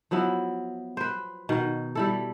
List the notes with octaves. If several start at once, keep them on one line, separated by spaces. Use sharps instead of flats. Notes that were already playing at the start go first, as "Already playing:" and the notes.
F3 F#3 B3 E4
B4 C5
B2 D#3
G3 E4 A4